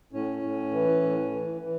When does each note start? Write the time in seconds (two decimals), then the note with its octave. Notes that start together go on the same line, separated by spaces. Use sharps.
0.12 A2 C#4
0.42 A2
0.72 E3
1.02 A2
1.31 E3
1.61 E3